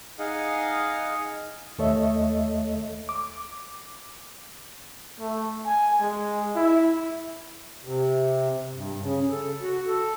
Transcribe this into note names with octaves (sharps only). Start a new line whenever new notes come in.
D#4 G#4 D#5 F5 F#5
D#2 A3 A4 C#5 D#5 E5
D6
A3
G#5
G#3
E4
C3
G2
C#3
A4
F#4
A4